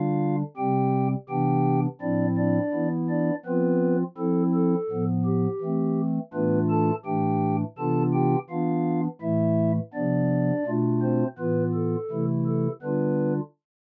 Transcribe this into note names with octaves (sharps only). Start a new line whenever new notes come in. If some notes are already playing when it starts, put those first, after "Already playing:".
Already playing: D3 G3 D4 F4 F5
C3 G3 C4 G4 G5
C3 E3 B3 D4 G4 G5
A2 F3 C4 D4 E4 D5
D4 D5
E3 B3 E4
D4 D5
F3 B3 C4 F4 B4
F3 C4 E4 A4
A4
A2 F3 B3
G4
E3 A3 C4
A2 E3 A3 B3 D4 F4 B4
A4 A5
A2 E3 A3 D4 G4 G5
C3 E3 B3 D4 F4 A4 A5
G4 G5
E3 B3 D4 F4 F5
A2 E3 A3 E4 E5
C3 F3 B3 D4 D5
B2 A3 D4 F4
C4 C5
A2 E3 B3 F4 B4
A4
C3 E3 A3 E4
A4
D3 G3 B3 D4 F4 B4